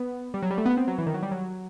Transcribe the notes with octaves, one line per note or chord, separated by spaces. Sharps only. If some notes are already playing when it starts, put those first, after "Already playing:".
Already playing: B3
G3
F#3
G3
A3
B3
C4
F#3
E3
D#3
F#3
G3
F#3